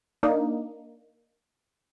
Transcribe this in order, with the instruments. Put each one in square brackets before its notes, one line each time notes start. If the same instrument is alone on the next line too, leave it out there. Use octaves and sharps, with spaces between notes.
[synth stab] A#3 D4 D#4